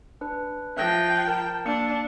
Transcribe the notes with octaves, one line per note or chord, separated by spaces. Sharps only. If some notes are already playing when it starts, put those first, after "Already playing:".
D4 B4
F3 E5 G5 F#6 A#6
A#4 A5
A#3 D4 E6 C#7